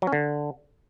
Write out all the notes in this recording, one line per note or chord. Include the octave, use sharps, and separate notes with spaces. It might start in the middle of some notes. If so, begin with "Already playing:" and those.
F#3
C#4
D3